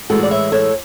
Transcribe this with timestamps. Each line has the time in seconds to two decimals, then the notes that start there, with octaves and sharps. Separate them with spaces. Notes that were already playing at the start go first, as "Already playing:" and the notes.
0.10 A2 E3 G#3 F#4 A4
0.23 D5
0.31 C#5 E5
0.52 A4 C#5